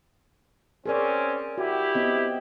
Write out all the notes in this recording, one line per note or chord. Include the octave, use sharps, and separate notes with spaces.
C4 C#4 G#4 A#4 D5
E4 F#4 G4
B3 C4 D#5